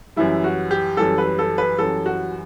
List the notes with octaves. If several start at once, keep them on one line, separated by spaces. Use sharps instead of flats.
F#2 E3 G3 E4
F#4
G4
F#2 E3 G3 A4
B4
A4
B4
F#2 E3 G3 A4
F#4